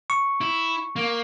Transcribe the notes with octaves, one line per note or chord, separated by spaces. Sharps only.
C#6
E4
A#3